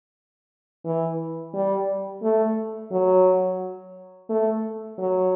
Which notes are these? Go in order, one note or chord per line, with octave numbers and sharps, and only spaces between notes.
E3
G3
A3
F#3
A3
F#3